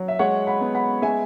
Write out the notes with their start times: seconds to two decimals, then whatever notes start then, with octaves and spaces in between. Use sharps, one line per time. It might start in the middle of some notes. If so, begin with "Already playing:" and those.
Already playing: F#3
0.08 E5
0.19 G#3 C#5 F#5
0.47 F#5 B5
0.61 B3
0.75 F#5 B5
1.02 G#3 E5 G#5